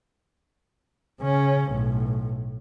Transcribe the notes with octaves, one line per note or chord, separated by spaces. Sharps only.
C#3 C#4
B1 A2